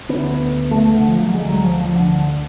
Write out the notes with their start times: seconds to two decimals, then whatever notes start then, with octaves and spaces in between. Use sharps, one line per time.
0.09 D2 D3 B3
0.71 A3
0.94 D3
1.07 F3
1.20 F#3
1.33 D2 D3 G#3
1.49 F#3
1.64 F3
1.80 F3
1.95 D3